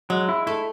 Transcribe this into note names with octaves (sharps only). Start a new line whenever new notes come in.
F#3 G#3
E4
A3 E4